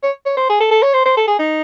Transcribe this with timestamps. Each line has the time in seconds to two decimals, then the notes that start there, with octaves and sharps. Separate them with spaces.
0.03 C#5
0.26 C#5
0.37 C5
0.49 G#4
0.60 A4
0.71 A4
0.82 C#5
0.93 C5
1.06 C5
1.17 A4
1.27 G#4
1.39 D#4